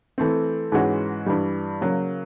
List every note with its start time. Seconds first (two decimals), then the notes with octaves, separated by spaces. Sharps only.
0.18 E3 A3 C4
0.72 G#2 E3 G#3 C#4 F#4
1.26 G2 E3 G3
1.81 C#3 F#3 A#3